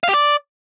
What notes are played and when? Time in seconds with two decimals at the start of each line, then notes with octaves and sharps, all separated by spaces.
0.04 F5
0.09 G4
0.14 D5